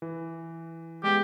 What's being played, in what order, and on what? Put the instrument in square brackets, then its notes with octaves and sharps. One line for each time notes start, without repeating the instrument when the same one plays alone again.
[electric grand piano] E3
[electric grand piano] G#3 B3 [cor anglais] G4